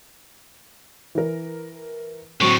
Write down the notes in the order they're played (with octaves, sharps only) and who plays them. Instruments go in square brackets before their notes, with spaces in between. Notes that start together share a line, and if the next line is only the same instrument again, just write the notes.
[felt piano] E3 A#4
[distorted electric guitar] A2 D3 [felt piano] F#3 C4 [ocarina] C#6